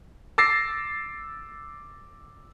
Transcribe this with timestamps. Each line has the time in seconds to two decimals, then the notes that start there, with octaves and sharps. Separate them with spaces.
0.38 D6 E6 A6 A#6 C7